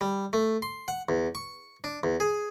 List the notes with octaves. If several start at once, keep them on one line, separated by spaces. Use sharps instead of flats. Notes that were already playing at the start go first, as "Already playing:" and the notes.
G3
A3
C6
F#5
E2
C#6
D4
E2
G#4